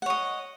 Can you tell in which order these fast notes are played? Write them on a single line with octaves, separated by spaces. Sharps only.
F#5 C#5 D#5